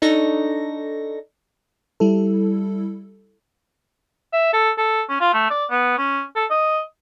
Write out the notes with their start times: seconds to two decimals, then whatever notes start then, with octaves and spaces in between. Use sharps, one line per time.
0.02 D4 D#4 A4 C#6 A#6
2.00 G3 E4 A4
4.33 E5
4.53 A4
4.78 A4
5.09 C#4
5.21 F4
5.33 A3
5.50 D5
5.71 B3
5.98 C#4
6.35 A4
6.50 D#5